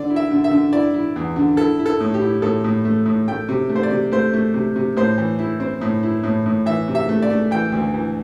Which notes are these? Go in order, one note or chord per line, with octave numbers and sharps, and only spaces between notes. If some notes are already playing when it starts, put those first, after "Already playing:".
Already playing: D3 D5
E4
E5
D3
E5
D3
E4 D5
E4
E2
D3
E4 A4
E4
A4
A2
G4
E4
A2 A4
A2
A3
A2
A3 G5
C3
A3
C5
D5
C3
A3 C5
A3
C3
C3
A2 C5
E3
E4
C4
A2
E4
A2
A2
E3 E5
C3
E5
A3
D5
A3
E3 G5
D2
E3